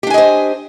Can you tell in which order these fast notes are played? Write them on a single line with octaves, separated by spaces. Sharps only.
G4 D4 G#5 D#5 C5